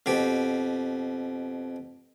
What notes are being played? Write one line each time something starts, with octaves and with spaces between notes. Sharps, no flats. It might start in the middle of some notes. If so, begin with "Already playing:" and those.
F2 B2 G4